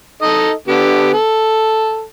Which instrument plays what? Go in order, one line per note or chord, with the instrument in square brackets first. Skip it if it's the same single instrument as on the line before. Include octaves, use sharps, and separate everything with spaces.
[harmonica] D#4 A4 D#5
D3 B3 G4
A4